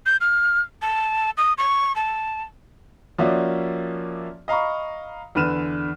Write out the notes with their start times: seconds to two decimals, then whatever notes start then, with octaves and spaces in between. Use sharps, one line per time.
0.06 G6
0.21 F6
0.82 A5
1.37 D#6
1.58 C#6
1.96 A5
3.18 F3 A#3 C#4 F#4 D5 E5
4.48 D#5 F5 A#5 B5 C#6
5.35 E2 D3 B4 F6 D#7 E7